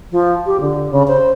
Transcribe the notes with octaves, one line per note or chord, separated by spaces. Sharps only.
F3
G4
D3
C#3
C5